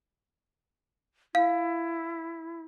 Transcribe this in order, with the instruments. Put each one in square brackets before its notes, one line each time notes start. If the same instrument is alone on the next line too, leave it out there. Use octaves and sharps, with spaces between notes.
[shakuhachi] E4 [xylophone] F5